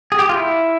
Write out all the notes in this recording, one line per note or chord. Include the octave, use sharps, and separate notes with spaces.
G#4
G4
F4
E4